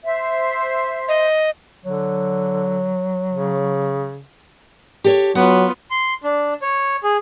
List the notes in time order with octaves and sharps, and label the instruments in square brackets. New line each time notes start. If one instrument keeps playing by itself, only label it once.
[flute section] C5 E5
[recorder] D#5
[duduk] D3 [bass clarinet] F#3
[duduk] C#3
[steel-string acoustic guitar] G4 A4 C#5
[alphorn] F#3 [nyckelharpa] B3 F4 [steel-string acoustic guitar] F#5
[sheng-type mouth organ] C6
D4
C#5
G#4